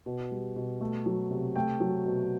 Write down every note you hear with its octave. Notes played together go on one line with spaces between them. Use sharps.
B2
G3
B2
A3
F#3
C3
A3 G5
F#3
B2